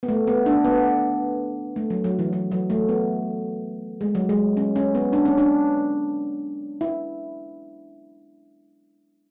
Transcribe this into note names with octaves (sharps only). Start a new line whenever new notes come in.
B3
A3
B3
D4
B3
A3
F#3
F#3
E3
F#3
F#3
A3
B3
G#3
F#3
G#3
C#4
C#4
B3
D4
C#4
D4
E4